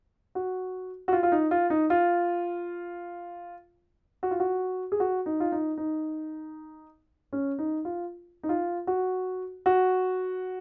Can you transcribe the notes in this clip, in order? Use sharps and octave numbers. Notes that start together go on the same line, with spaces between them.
F#4
F#4
F4
F4
D#4
F4
D#4
F4
F#4
F4
F#4
G#4
F#4
D#4
F4
D#4
D#4
C#4
D#4
F4
D#4
F4
F#4
F#4